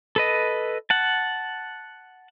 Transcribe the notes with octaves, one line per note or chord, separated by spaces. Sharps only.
A4 B4 D#5
F#5 A5